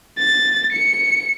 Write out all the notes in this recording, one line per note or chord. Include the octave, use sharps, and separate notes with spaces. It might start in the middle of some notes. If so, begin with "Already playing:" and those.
A6
C#7